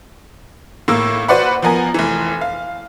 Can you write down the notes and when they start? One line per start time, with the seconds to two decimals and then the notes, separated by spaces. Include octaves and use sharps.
0.88 A2 A#3 E6
1.28 F#4 B4 C5 D5 F#5 B5
1.62 F3 B3 A#4 G#5
1.94 F1 E3
2.41 F5